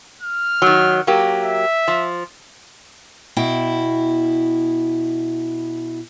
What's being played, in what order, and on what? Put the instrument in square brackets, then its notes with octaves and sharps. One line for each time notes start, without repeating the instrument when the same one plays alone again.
[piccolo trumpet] F6
[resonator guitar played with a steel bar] D#3 F#3
F#3 A#3 G4
[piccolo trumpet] E5
[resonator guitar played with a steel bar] F3
[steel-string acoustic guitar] B2 E4 G5